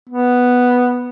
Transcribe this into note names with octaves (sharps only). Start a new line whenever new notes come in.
B3